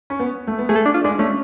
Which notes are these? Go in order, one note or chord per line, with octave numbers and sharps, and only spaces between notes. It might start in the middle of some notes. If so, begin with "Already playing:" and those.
C#4
B3
A3
B3
A3 G#4
A4
D4
F4
G#3 D4
A3 C#4